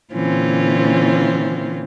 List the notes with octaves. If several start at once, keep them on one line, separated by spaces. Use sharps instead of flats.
A#2 D3 E3 C4 C#4 F4